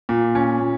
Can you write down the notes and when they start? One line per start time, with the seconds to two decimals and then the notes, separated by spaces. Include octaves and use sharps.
0.09 A#2
0.35 C#4
0.61 A#2